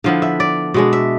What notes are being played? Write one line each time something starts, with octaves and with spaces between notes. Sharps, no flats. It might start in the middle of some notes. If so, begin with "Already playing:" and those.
D3 F3 B3 E4 F5
E5
D5
B2 G#3 D4
E5